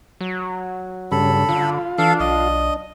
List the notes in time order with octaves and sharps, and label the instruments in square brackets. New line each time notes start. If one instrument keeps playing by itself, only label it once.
[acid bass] F#3
[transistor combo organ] G2 C#3 [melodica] A4 B5
[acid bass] D3 [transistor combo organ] F4
[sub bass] E3 [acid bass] D4 [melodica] A4 F5
[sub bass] B1 [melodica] D#5